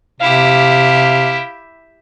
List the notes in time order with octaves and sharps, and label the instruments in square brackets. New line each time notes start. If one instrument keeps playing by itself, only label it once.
[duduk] C3 [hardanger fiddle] E4 G4 [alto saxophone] F5